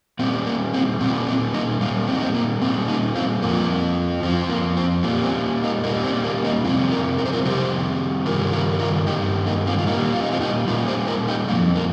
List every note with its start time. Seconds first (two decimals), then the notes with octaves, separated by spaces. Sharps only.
0.19 A#2 C4
0.23 G3
0.46 A#3
0.73 C4
1.00 A#2 G3 C4
1.27 C4
1.54 A#3 D#4
1.81 A#2 G3 A#3
2.07 C4
2.16 D#4
2.23 C4
2.34 A#3
2.61 A#2 G3 C4
2.88 A#3 D#4
3.15 C4 F4
3.42 F2 F3 A#3
4.23 F2 C4
4.26 F3
4.49 A#3
4.77 C4
5.03 A#2 G3 A#3
5.23 C4
5.64 A#3 D#4
5.84 A#2 G3 A#3 D#4
6.04 C4
6.24 A#3
6.45 A#3 D#4
6.64 F2 C3 G3 C4 F4
6.91 F4 A#4
7.18 A#4
7.26 C5
7.33 F4 A#4
7.45 F2 C3 G3 G4 C5
8.26 G2 D#3 G3 F4 A#4
8.52 F4 A#4
8.79 F4 A#4
9.06 G2 D#3 G3 D#4 G4
9.47 A#3 D#4
9.67 C4 F4
9.78 F4
9.87 A#2 G3 A#3 D#4
10.14 F4
10.23 D#4
10.32 C4 F4
10.41 D#4 G4
10.67 A#2 G3 F4 A#4
10.88 G4 C5
11.08 F4 A#4
11.28 D#4 G4
11.48 F2 F3 A#3 D#4
11.76 A#3